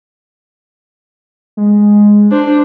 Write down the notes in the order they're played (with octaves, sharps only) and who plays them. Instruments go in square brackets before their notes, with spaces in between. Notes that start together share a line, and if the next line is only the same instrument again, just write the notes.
[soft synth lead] G#3
[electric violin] D4 [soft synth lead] C5